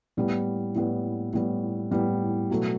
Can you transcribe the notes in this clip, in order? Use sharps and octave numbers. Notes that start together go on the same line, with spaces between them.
A2 G3 B3
A2 G3 B3
A2 G3 B3
A2 G3 B3
B2 F#3 A3